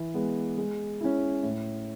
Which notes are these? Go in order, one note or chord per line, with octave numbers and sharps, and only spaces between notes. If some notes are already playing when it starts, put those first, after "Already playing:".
Already playing: E3
G#3 B3
G#3
C#4 E4
A2